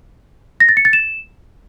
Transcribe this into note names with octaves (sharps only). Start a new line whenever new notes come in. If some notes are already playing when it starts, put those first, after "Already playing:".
A#6
A6
C#7
A6
E7